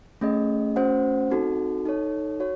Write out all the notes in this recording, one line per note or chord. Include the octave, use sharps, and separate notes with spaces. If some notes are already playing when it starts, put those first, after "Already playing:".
A3 C#4 G#4 D#5
A3 C#4 F#4 C5 F#5
C4 D#4 F#4 A4
D#4 A4 C#5
F#4 C#5